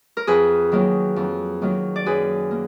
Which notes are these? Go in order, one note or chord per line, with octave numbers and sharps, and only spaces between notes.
A#4
F2 G#4 B4
D#3 F#3 A#3
F2
D#3 F#3 A#3
D5
F#2 G#4 B4
A#3